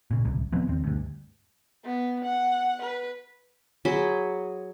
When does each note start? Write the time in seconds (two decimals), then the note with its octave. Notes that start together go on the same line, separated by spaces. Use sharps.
0.11 A#2 C#3
0.25 D1 C2
0.52 D1 F3 B3 C4
0.67 E1 D#2 C4
0.84 D2 G2
1.85 B3
2.24 F#5
2.81 B4
3.85 F#3 G#4 B5 C6